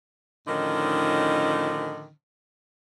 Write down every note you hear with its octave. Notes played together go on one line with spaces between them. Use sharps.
A2 D3 D#3 F3 C#4 D#4